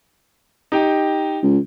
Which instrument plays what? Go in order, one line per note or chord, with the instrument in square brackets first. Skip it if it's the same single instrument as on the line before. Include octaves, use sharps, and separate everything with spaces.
[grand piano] D#4 G4 G5
[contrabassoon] C#2